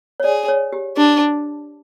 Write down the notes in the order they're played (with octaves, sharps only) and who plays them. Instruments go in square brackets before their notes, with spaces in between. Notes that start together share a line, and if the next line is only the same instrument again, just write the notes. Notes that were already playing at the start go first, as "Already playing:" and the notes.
[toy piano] C#5
[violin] G#4 [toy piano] D5
[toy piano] C#5
G4
[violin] D4 [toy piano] G4